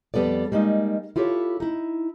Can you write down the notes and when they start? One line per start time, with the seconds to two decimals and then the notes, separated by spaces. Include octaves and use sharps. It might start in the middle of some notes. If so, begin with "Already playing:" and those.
0.14 F2 G3 B3 A4 D5
0.52 G3 G#3 A#3 D#4
1.16 E4 F4 G4 A4 C#5
1.60 D#4 E4